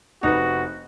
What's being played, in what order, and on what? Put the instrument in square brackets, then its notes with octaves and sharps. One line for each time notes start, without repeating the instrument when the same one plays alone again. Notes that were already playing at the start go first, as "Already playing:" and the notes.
[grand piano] F1 B3 B4 [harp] D#4 [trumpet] F#4